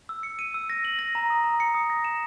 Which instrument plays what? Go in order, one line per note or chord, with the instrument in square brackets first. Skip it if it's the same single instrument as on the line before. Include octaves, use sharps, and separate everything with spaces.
[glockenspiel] E6
C#7
D#7
E6
A#6
F#7
A#6
A#5
D#6
A#5
C#7
D#6
A#6
E7